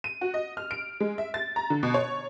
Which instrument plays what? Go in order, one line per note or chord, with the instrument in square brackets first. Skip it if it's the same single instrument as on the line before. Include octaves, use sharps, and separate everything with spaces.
[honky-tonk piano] D#7
F#4
D#5
F6
D7
G#3
E5
A6
A#5
D3
B2
C#5